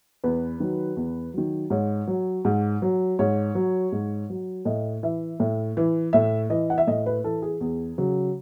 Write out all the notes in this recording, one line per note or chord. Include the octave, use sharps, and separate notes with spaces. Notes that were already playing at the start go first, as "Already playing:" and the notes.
E2 B4
D#3 F#3
E2
D#3 F#3
G#2 C#5
F#3
G#2
F#3
G#2 C#5
F#3
G#2
F#3
A2 D#5
E3 E5
A2
E3
A2 E5
E3 D#5
F#5
E5
A2 D#5
B4
E3 A4
G#4
E2 G#4
C#3 F#3